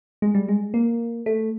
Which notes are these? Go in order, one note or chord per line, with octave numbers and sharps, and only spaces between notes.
G#3
G3
G#3
A#3
A3